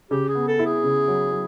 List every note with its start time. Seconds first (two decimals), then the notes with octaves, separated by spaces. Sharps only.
0.11 C#3 G4
0.29 G#4
0.35 B3
0.48 A4
0.59 E4
0.66 G#4
0.84 C#3
1.08 F#3
1.32 F#3